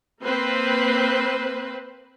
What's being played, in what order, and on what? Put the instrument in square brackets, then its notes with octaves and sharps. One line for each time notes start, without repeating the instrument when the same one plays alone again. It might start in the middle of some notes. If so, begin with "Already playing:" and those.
[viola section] A#3 C4 B4 C5